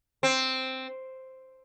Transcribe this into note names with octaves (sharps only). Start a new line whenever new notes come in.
C4